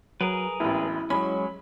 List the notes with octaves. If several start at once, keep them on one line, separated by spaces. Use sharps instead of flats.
F#3 G#4 A#4 B4
E1 A1 E4
F#3 G#3 C#4 B5